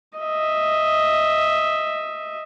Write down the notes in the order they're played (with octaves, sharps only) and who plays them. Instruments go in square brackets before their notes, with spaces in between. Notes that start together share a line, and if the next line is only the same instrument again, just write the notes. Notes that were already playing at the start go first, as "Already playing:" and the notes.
[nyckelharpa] D#5 E5